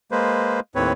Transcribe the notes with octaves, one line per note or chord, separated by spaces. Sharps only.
G#3 A#3 B4 C5
D#2 A2 C4 B4 C#5